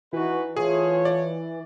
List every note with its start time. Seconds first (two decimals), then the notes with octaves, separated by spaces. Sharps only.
0.13 E3 D#4 F#4 B4
0.57 A3 F4 G#4 C#5
1.05 D5